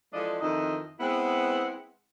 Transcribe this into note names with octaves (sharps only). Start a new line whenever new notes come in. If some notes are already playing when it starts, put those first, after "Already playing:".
E3 F3 G#3 D4 A4 D#5
F2 D#3 E3 D#5
G#3 B3 C4 E4 B4 F#5